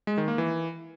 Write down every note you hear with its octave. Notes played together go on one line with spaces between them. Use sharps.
G#3
D#3
A#3
E3